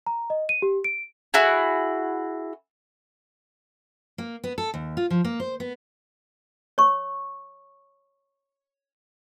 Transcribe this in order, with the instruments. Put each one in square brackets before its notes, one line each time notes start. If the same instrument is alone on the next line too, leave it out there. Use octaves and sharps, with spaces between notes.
[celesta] A#5
D#5
D#7
G4
D7
[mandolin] E4 F#4 G#4
[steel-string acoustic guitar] A#3
B3
A4
D#2
F4
F3
A#3
C5
B3
[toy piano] C#5 C#6